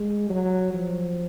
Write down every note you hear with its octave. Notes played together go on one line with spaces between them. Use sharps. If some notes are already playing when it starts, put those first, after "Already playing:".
Already playing: G#3
F#3
F3